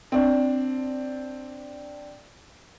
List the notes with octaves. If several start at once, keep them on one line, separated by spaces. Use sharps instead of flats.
C4 D4